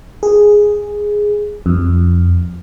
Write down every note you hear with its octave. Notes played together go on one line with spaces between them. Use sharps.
G#4
F2